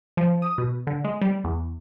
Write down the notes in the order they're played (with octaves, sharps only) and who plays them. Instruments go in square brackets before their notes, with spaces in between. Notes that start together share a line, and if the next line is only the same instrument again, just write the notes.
[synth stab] F3
D#6
B2
D3
G#3
G3
E2